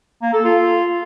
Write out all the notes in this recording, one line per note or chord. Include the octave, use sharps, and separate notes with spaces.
A#3
A4
F4